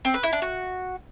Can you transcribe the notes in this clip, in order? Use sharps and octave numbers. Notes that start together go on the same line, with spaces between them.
C4
B4
E4
D4
F#4